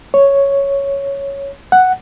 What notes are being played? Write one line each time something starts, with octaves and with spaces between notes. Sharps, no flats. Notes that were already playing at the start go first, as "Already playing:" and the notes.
C#5
F#5